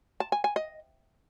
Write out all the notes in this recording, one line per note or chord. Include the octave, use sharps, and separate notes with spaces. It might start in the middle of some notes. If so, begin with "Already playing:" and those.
A5
G#5
G#5
D#5